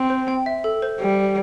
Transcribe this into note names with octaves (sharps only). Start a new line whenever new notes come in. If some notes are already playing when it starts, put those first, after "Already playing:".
Already playing: C4
C5
G5
E5
A4
C5
G3